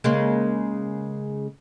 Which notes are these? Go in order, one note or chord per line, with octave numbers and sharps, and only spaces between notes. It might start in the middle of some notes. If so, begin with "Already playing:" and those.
C#3 G#3 A#3